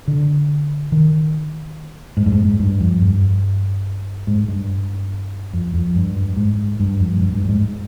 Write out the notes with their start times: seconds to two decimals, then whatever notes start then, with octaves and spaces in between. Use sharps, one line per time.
0.08 D3
0.92 D#3
2.17 G#2
2.26 G2
2.32 G#2
2.45 G#2
2.59 G2
2.80 F2
3.02 G2
4.27 G#2
4.48 G2
5.53 F2
5.74 F2
5.96 G2
6.16 G2
6.37 G#2
6.80 G2
7.00 F2
7.16 G#2
7.21 G2
7.34 G2
7.45 G2
7.49 G#2